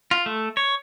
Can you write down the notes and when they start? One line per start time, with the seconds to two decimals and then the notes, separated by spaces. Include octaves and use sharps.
0.11 F4
0.26 A3
0.57 C#5